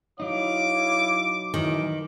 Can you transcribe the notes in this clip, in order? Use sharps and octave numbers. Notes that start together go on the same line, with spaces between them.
F#3 D#4 E4 C#5 F5 D6
F#2 A2 D#3 E3 D6